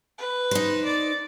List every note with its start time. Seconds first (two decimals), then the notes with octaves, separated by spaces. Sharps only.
0.18 B4
0.51 D#4 C5
0.85 D5 A6